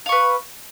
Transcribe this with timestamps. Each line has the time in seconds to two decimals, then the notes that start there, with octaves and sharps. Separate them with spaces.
0.06 F5
0.09 C#6
0.12 B4